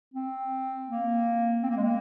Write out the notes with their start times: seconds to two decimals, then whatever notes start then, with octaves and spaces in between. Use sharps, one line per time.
0.14 C4
0.88 A#3
1.63 C4
1.70 A#3
1.77 G#3
1.84 A#3